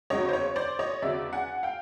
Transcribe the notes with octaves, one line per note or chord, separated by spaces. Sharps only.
E2 C#3 F#3 C#5 D#5
C5
C#5
C5 D5
C#5 D#5
E2 C#3 F#3 D5 E5
F#5 G#5
F5 G5